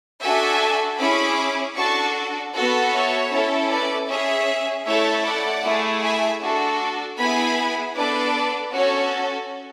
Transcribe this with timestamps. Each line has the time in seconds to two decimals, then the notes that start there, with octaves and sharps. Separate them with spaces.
0.22 D4 F#4 A4 E5 G#5
0.99 C#4 E4 G#4 B5 D6
1.76 D4 F#4 A4 A5 C#6
2.54 B3 F#4 A4
2.93 C#5 E5
3.31 C#4 E4 A4
3.70 B4 D5
4.08 C#4 G#4 C#5 E5
4.86 A3 E4 A4 C#5 E5
5.24 D5 F#5
5.63 A3 E4 G#4
6.02 E5 G#5
6.41 D4 F#4 A4
7.18 B3 E4 G#4 G#5 B5
7.95 B3 D4 A4 B4 D5
8.73 C#4 F#4 A4 C#5